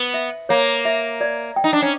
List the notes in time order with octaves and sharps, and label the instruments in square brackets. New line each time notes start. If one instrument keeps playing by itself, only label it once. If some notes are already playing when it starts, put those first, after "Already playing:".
Already playing: [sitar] B3 [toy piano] B4
[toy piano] E5
[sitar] A#3 [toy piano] C#5
[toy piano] E5
D5
G5
[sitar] D#4
D4
C#4